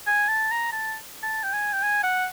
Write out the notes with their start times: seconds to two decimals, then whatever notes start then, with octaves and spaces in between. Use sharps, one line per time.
0.07 G#5
0.28 A5
0.51 A#5
0.72 A5
1.23 A5
1.43 G5
1.53 G#5
1.73 G5
1.82 G#5
2.04 F#5